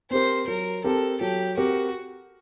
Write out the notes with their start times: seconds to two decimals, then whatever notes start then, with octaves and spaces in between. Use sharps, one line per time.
0.11 C4 G4 A#4 C5
0.47 F#3 A#4
0.84 C4 G4 A4 A#4
1.21 F#3 G4
1.57 C4 F#4 G4 A#4